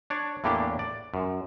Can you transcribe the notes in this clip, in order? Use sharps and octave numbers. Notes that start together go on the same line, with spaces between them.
D4 C#5 D5
E2 A2 A#3 D4 G4 G5
D5
F#2